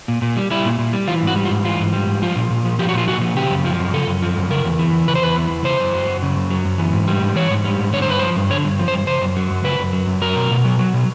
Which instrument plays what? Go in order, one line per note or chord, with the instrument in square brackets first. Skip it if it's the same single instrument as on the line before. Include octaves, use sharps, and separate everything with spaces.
[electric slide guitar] A#2
A#2
G3
G3 E4
A#2
A#2
G3
E3 F4
G#2
F#4
G3
F4
G#2
E3 F4
G#2
G3
G#2
F3 F4
A#2
A#2
F3
F3 G4
F#4
A#2 F4
A#2 F#4
F3
C#3 G4
F#2
F3
F#2
C#3 A4
F#2
F3
F#2
C#3 A#4
E2
E3
E2
C#3 B4
C5
E2 B4
E3
E2
C#3 C5
F#2
F#3
F#2
C#3
F#2
F#3
F#2
E3
G#2
G3
G#2
E3 C#5
G#2
G3
G#2
D3 C#5
C5
G2 B4
F3 C5
G2
D3 C#5
G2
F3
C5
G2
C#3 C5
F#2
F#3
F#2
C#3 B4
F#2
F#3
F#2
F#3 A#4
B2
B2
F#3
F#3
B2